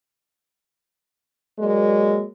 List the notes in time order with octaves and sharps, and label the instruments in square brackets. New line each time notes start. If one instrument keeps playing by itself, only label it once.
[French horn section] F#3 G#3 A#3 A#4 D5